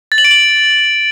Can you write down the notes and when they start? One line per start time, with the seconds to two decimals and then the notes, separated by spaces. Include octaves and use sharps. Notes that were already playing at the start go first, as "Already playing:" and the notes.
0.12 A6
0.18 F#7
0.25 D7
0.31 F#7